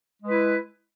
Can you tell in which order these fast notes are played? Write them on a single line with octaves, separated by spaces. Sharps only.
G#3 B4 E4